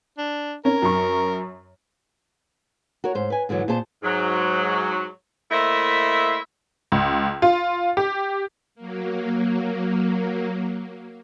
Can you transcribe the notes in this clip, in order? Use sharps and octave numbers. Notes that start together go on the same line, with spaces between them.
D4
C#4 A#4
F#2 C#6
F#4 A#4 C#5
G#2 C5
B4 G#5
G#2 D3 E3 F#3
A#2 G#4 C5 A5
G#2 F#3
A3 A#3 E4 C5 D#5 E5
C#2
F4
G4
F#3 A#3